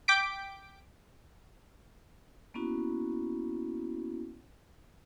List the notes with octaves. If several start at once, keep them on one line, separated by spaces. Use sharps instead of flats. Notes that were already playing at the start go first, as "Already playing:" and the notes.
G5 D6 G6 B6 D7
A#3 B3 C#4 E4 F#4